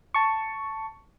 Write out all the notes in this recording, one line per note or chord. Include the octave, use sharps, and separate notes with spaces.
A5 C#6